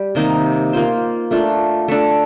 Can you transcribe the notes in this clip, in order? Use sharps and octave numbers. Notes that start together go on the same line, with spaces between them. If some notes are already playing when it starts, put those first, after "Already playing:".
Already playing: G3 G4
C3 D#3 A#3 D#4
A#3 F4 C5
A3 D4 F4
A3 D4 A4